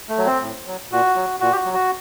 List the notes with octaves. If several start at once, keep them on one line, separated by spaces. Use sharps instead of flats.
A3
F#3
C4
A2
F#3
A#2 F#4
F#3
A#2 F#4
G4
F#4
F#3
F#4